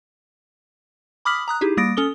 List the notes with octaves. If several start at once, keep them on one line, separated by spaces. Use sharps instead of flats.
B5 D6 D#6 F6 B6 F#7
A#5 D#6 F#6
D#4 E4 G4 G#4
G3 A#3 D#6 A6 A#6 D7
C#4 A4 D#6 G7